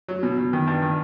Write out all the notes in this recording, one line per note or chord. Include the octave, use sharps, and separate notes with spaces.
F#3
B2
B2
D#3
G2
D#3